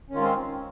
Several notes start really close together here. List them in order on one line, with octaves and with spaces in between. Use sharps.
C#4 D#3 F4 G#3 C4